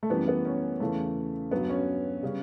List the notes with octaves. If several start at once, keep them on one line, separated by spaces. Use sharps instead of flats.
A3
F#2 E3 G3 B3
B3
C#4
E2 C#3 E3 A3
G2 F#3 B3
C#4
C#3 G3